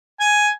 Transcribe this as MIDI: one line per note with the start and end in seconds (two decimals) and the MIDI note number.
0.20 0.48 80